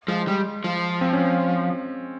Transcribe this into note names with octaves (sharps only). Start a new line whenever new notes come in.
F3 G#3
G3
F3
C4
C#4